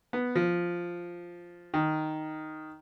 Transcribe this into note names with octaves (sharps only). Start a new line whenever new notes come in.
B3
F3
D#3